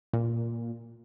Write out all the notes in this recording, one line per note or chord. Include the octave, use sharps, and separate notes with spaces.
A#2